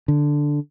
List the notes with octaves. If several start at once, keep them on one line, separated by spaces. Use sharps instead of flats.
D3